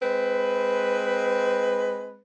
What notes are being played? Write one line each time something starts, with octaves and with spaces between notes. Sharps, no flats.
G#3 C4 B4